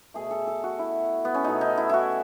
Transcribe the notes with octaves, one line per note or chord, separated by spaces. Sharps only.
B2 A3 G#4
A4
A4
F#4
E4
B3
C#4
B2 A3 D#4
D#4
E4
E4 F#4